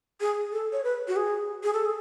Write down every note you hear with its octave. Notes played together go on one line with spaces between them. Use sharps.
G#4
A4
C#5
B4
F#4
G#4
G#4
A4
G#4